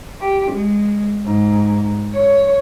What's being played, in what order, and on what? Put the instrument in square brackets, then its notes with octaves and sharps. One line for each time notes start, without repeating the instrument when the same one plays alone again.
[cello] G4
G#3
G#2
C#5